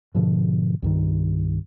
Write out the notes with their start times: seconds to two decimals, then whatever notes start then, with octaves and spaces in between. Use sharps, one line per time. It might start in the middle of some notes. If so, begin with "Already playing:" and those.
0.15 G#2 B2 D3 F3
0.82 C2 G2 D#3